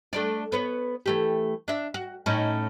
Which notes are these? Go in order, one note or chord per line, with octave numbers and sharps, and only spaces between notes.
A3 D4 D5
B3 B4 C#5
E3 A3 G4
D4 E5
F#4
A2 C#4 D#4